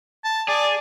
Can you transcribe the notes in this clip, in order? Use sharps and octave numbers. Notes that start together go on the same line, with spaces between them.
A5
G#4 D5